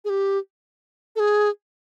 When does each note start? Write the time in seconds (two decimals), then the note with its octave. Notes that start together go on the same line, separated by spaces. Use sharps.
0.05 G#4
0.10 G4
1.16 A4
1.20 G#4